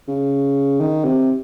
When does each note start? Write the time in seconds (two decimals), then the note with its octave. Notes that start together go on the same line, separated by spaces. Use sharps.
0.08 C#3
0.80 D#3
1.05 C3